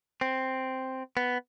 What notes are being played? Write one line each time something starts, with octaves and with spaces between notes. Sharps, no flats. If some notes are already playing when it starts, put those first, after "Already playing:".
C4
B3